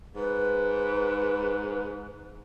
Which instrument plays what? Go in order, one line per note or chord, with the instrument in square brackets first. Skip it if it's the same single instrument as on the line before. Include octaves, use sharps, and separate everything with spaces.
[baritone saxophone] G#2 [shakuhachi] B4